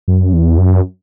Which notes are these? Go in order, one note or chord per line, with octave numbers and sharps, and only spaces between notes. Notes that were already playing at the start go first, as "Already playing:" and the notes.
F#2
E2
F#2